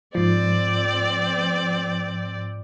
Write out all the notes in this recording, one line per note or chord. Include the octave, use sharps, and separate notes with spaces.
G#2 F3 C4 D5